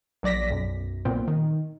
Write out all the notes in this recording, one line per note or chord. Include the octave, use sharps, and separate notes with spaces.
A#1 F#3 D5 A#6 B6
B1 F#2
B1 A#2 B3 C4
D#3